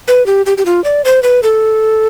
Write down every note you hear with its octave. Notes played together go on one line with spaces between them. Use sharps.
B4
G4
G4
G4
F4
D5
C5
B4
A4